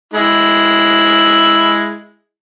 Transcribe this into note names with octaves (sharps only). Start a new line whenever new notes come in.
G#3 E4